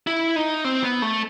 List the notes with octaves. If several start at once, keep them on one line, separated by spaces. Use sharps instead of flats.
E4
D#4
C4
B3
A3